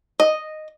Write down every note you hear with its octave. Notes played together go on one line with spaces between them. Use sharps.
D#5